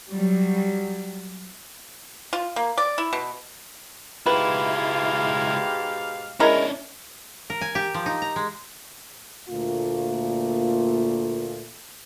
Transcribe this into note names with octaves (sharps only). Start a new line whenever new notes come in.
F#3 G3
F4
A#3
D5
E4
B2
C#2 G#2 B2 E4 G4 B4 F5
G#3 C#4 D4 E4 A#4
A#4
G#5
G4
F3
D#4
A#5
G#3
D2 A#2 A3 A#3 F4